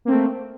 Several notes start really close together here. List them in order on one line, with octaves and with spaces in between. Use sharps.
A#3 C4 A3